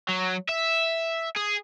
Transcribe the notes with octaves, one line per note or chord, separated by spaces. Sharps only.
F#3
E5
G#4